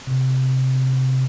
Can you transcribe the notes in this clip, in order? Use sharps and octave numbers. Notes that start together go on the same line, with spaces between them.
C3